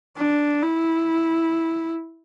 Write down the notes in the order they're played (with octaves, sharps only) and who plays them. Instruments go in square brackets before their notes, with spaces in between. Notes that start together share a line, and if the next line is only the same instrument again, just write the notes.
[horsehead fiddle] D4
E4